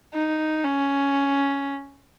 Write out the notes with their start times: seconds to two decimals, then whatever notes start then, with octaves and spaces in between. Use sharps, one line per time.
0.14 D#4
0.65 C#4